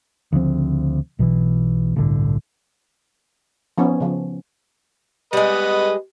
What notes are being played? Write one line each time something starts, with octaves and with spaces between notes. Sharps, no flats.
D2 C#3 F3 C4
B1 B2 D3 E3
G1 C2 A2 D3
F3 B3 C#4 D#4
C#3 F3
G3 G#3 B4 D#5